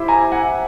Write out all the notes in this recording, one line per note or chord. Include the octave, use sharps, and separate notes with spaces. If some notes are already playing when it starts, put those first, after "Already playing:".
Already playing: E4 G4 C5
G#5 A#5
F#5 G#5